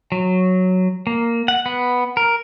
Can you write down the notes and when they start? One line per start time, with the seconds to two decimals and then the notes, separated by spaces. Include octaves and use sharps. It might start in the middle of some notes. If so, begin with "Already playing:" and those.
0.12 F#3
1.07 A#3
1.48 F#5
1.66 B3
2.17 A#4